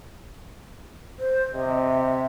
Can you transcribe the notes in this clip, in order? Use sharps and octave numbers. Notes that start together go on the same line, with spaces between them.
C5
C3 D#5
E5